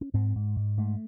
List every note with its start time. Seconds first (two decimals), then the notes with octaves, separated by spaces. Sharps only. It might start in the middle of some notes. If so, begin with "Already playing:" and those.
0.01 C#4
0.14 G#2 C4
0.36 G#2
0.56 G#2
0.77 G#2 A3